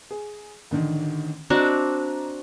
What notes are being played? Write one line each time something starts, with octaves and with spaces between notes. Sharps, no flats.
G#4
A1 D3 D#3
C4 D4 F#4 D#5 A#5